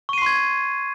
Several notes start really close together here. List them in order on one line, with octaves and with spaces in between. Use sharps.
C#6 D#7 C7 C6 G#6